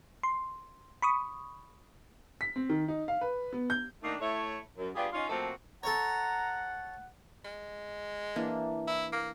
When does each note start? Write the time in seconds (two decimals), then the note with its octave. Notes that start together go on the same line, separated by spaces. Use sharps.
0.23 C6
1.02 B5 C#6 D#6
2.41 B6
2.56 C4
2.70 D#3
2.88 D#4
3.08 F5
3.21 B4
3.53 B3
3.70 G6
4.03 D#3 A3 A#3 D4 D#4
4.20 A3 E4 C#5
4.77 F#2
4.95 G3 B3 D4 F4 G4 G#4
5.12 C#4 D#4 F4
5.29 F3 A3 A#3 C4 F#4 A4
5.83 A4 C#5 F#5 A#5
7.45 G#3
8.36 E3 A#3 D4
8.87 E4
9.12 A#3